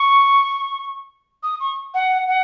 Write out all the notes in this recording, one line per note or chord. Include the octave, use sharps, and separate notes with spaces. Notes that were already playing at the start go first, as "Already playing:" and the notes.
Already playing: C#6
D#6
C#6
F#5
F#5